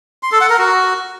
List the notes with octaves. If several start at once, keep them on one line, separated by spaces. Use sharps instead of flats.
C6
A4
F#5
A#4
F#4